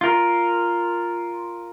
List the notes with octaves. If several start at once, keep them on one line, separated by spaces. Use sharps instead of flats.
F4 A#4